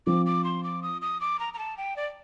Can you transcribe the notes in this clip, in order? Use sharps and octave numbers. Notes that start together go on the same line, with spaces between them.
F3 C4 F4 D6
D6
C6
D6
D#6
D#6
D6
A#5
A#5
A5
G5
D5